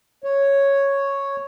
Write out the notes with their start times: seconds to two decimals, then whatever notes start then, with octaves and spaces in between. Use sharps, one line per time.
0.24 C#5